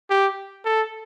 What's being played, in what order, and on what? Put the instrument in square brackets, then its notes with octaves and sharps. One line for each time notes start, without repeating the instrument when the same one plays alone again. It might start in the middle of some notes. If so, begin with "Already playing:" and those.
[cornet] G4
A4